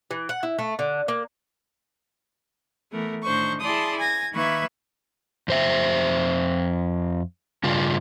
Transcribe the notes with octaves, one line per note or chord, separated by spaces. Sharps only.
E3
F#5
E4
A3
D3
A#3
E3 A3 B3 A#4
A2 D#3 D4 D#4 C5 C#6
E4 G#4 D5 A5 C6 D#6
G#5 G#6 A#6
D#3 A#3 B4 E5 C#6 G#6
F2 C5 E5
G2 C#3 G3 F4